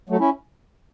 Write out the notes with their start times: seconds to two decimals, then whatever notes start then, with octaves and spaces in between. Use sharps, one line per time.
0.09 F#3 A3
0.20 C#4 E4